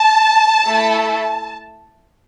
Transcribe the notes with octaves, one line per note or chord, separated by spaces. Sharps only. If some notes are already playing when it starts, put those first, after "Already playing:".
Already playing: A5
A3 E4 A4